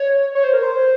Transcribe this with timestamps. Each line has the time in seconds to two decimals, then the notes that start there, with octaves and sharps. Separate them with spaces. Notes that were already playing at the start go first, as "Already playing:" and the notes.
Already playing: C#5
0.35 C#5
0.44 C5
0.54 A#4
0.63 C5